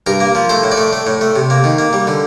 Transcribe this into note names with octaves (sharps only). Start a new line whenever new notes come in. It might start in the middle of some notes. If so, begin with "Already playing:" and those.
G2 A#4
A#3
F3
A3 C5
A2
D5
A3
A3
A2
A3
C3
A#3
D#3
A#3
G3
D3